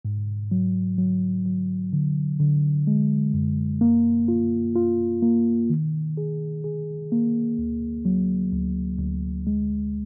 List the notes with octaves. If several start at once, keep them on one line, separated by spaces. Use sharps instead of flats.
G#2
F#3
F#3
F#3
D3
D3
G#3
F#2
A#3
F4
F4
A#3
D#3
G#4
G#4
A#3
D2
F#3
D2
D2
G#3